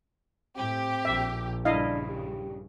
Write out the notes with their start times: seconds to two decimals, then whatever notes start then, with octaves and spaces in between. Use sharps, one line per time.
0.58 A2 C4 G4
1.05 A#1 E5
1.65 G2 C#3 D4 E4 D#5 F5
2.09 G4